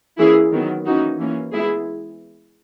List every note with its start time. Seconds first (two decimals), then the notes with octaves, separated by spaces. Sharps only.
0.19 E3 A#3 C#4 E4 G#4
0.52 D#3 F#3 B3
0.86 E3 A#3 C#4 D#4 F#4
1.19 E3 A#3 C#4
1.52 E3 G#3 B3 E4 G#4